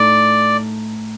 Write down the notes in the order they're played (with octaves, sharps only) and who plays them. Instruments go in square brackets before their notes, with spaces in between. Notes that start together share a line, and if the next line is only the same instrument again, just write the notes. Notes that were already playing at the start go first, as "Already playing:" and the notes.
Already playing: [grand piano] A2 A3 D#4 [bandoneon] D5